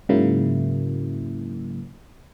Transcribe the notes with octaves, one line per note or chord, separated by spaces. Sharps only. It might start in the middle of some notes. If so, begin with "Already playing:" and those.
G#2 C#3 F#3 A#3 E4